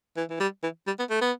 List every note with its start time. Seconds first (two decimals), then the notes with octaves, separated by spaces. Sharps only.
0.16 E3
0.30 E3
0.40 G3
0.63 E3
0.87 G3
0.99 B3
1.09 A3
1.21 B3